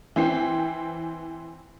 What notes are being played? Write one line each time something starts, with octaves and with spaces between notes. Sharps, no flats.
E3 C4 C7